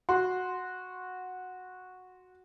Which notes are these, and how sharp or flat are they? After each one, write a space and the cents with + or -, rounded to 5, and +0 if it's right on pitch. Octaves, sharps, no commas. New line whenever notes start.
F#4 -10 C6 +0